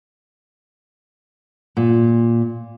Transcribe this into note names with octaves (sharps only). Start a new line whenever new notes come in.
A#2